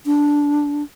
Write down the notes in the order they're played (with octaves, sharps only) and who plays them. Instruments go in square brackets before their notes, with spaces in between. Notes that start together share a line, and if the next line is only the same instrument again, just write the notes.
[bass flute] D4